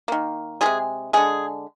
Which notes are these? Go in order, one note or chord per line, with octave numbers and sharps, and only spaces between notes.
D#3 A#3
C3 F3 G#3 G#4
D3 G#3 G#4